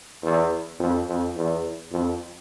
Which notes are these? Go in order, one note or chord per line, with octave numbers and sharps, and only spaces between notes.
E2
F2
F2
E2
F2